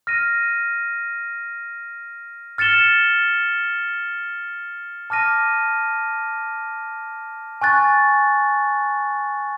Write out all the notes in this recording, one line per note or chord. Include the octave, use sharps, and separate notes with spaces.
F6 A#6 D#7
F6 A6 C#7 E7 G7
A5 D6 F6 A#6 D#7
G#5 C#6 F#6 A6